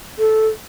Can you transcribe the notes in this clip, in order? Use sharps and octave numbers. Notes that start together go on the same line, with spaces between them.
A4